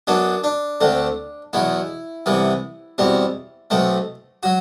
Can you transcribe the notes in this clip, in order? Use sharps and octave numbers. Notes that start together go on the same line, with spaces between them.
F#2 F#3 B3 D4
D4
D2 D3 A3 C4
E2 B2 F#3 E4
C2 C3 E3 B3
E2 B2 G3 C4
B1 B2 A3 C4
F#3 F#4